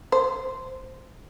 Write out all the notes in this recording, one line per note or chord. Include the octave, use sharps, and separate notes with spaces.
C5